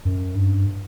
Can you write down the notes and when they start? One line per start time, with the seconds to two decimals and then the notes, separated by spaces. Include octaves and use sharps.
0.05 F#2
0.35 G2